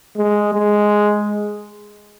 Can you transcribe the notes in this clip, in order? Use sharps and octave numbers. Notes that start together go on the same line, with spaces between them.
G#3
G#3